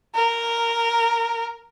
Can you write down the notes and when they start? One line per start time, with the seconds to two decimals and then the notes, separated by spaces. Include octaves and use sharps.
0.15 A#4